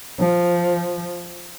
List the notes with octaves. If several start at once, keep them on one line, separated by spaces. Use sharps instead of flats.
F3